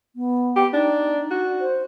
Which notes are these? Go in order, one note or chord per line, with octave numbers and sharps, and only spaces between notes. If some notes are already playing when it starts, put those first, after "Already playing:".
B3
G4
D4 D#4
F#4
C5